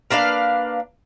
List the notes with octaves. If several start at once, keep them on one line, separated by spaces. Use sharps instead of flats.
A#3 D4 B4 F5